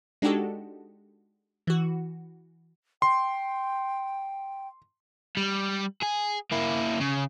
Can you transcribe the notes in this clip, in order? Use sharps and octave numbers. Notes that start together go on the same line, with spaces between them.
G#3 D4 D#4 F#4 G4 A4
E3 F#4
G5 C6
G3
G#4
A#3 E4
C#3